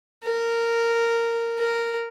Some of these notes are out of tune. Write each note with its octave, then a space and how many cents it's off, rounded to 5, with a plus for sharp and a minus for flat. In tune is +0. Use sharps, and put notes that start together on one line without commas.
A#4 -10
A#4 -5